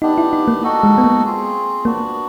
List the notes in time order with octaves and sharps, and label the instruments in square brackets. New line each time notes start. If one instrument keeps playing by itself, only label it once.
[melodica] B3 D4 G4 [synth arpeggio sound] D#4
[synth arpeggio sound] E4
D#4
A#3
[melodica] D#4 F#4 A4
[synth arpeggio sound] G#3
B3
A#3
[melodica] C4 F4 G#4
[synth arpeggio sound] A#3 [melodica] B3 D4 F#4